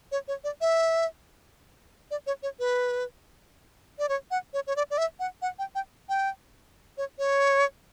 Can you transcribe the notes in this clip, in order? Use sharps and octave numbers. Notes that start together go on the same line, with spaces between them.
C#5
C#5
D5
E5
D5
C#5
C#5
B4
D5
C#5
F#5
C#5
C#5
D5
D5
E5
F#5
F#5
G5
G5
G5
C#5
C#5